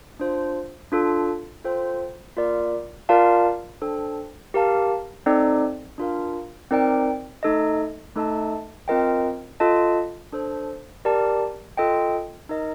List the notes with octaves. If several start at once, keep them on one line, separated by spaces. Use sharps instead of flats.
D4 F4 C5
D4 F4 A4
F4 A4 C5 G5
A#3 F4 A#4 D5
F4 A#4 D5 F5 A5
D4 A4 C5 G5
G4 A#4 F5 A5
C4 D#4 A4 D5
D4 F4 A#4 F5
C4 D#4 A#4 D5 G5
A3 D#4 A4 D#5
A3 D#4 A4 D#5 A5
C4 F4 A#4 D#5 G5
F4 A4 D#5 A5
D4 A4 C5
G4 A#4 D5 A5
F4 A4 D#5 G5
D#4 A#4 D#5